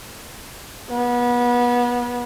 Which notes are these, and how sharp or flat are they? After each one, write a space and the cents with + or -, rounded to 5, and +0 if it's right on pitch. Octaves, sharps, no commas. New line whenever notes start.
B3 -25